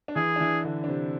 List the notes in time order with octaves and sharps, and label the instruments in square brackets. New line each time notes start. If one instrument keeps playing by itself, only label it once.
[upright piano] D4
[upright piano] E3 E4 [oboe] G#4
[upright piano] D4
E3 E4
D3 D4
D4
C3 C4